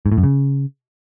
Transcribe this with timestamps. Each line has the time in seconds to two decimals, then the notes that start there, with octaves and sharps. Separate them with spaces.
0.06 G#2
0.12 A2
0.18 F#2
0.23 C#3